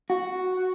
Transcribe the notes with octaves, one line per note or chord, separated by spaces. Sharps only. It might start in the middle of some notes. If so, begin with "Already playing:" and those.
F#4